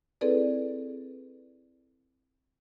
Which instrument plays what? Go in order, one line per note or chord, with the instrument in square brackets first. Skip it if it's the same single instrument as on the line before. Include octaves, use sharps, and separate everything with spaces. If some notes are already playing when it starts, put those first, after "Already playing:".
[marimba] C4 E4 G#4 A4 B4 D5